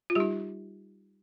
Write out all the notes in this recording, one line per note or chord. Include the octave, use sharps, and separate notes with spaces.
F4
G3 D#4 G4